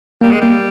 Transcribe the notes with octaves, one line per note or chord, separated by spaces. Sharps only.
G3 A#3
G#3
G3 A#3